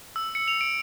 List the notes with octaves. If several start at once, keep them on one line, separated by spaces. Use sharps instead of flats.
E6
C#7
F7
D7